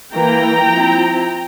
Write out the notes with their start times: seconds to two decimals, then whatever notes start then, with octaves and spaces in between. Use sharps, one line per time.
0.14 E3 A#3 E4 G5 A#5
0.71 F3 C4 E4